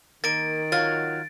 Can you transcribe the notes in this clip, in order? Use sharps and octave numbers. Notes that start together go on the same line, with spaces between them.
D#3 A#3 A6 D7
F#3 F4 C#5 A6